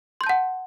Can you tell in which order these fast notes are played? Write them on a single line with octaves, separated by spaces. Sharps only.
C6 G6 A5 F#5